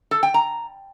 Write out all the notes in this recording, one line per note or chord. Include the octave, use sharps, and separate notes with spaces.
A4
G5
A#5